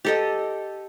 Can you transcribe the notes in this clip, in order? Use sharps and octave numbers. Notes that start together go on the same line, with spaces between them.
G4 A4 D#5